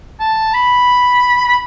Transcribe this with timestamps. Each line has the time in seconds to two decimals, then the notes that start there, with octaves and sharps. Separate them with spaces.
0.20 A5
0.54 B5
1.48 B5